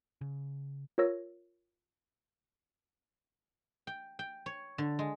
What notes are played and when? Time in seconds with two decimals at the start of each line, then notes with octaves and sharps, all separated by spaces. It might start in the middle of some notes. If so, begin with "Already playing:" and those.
0.21 C#3
0.98 F4 A#4 C#5 E6 A#6
3.87 G5
4.19 G5
4.46 C#5
4.78 D3
4.99 G#3